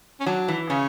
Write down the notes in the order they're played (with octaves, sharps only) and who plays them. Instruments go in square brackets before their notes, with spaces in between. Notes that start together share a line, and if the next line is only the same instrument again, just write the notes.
[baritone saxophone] C#4
[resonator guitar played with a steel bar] F#3 [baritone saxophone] D4
[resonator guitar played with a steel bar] E3
[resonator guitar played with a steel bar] C#3 [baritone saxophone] C#4